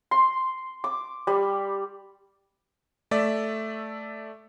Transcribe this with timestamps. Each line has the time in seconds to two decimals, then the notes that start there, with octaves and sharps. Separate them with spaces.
0.11 C6
0.84 D6
1.27 G3
3.11 A3 D5 E5 E6